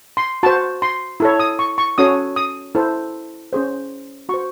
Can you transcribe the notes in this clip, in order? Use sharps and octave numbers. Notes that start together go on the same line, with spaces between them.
C6
F#4 C5 A5
C6
E4 A4 C#5
D#6
C#6
C#6
C#4 F#4 A4 C#5 D#6
D#6
E4 A4 C5
C#4 G#4 C5
F#4 C5 C#6